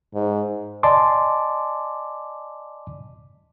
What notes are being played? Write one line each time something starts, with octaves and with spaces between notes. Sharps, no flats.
G#2
D5 D#5 G#5 A5 C6 D6